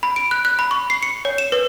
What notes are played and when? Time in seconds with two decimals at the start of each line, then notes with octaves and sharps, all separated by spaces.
0.03 B5
0.16 D7
0.31 F#6
0.45 F#6
0.59 B5
0.71 C#6
0.90 C7
1.03 C#7
1.25 C#5
1.38 E7
1.52 B4